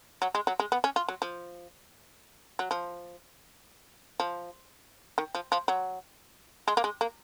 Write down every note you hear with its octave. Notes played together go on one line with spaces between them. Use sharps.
F#3
G#3
F#3
G#3
B3
C#4
F4
F#3
F3
F#3
F3
F3
D#3
F3
F3
F#3
G#3
A#3
G#3
A#3